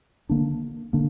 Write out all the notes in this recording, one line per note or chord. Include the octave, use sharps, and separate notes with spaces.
D3 A#3 D4
D3 A#3 D4